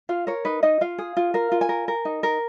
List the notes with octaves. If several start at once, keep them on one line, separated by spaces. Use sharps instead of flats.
F4 F5
A#4 C#5
D#4 B4
D#4 D#5
F4 F5
G#4
F4
A#4 F5
F4
G#5
A#4
A#4
D#4
A#4